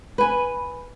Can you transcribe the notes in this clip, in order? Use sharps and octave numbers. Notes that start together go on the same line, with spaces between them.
B4 G#5